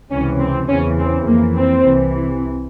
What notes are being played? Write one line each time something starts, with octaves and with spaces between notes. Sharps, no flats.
C#2 C3 E3 C#4
C4
E2 C#3 E3 C#4
C4
F2 E3 A#3
C4
C2 C3 E3